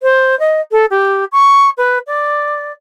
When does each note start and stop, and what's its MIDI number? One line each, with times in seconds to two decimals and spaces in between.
0.03 0.38 72
0.39 0.61 75
0.71 0.85 69
0.90 1.24 67
1.32 1.70 85
1.77 1.98 71
2.07 2.72 74